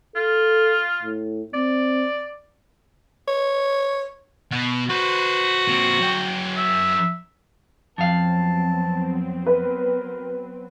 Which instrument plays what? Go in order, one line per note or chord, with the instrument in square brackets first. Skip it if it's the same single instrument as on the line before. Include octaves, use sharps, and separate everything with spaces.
[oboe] F4 [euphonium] A4
[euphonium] A2
[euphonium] C4 [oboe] D5
[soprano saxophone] C#5
[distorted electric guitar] B2
[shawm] F#4 [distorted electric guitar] B4 C5
[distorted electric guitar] A#2 C4
F#2 G5
[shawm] E5
[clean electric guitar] F2 F5 [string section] F#3 B3 C4 [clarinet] A5
[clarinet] A#4 [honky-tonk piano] B4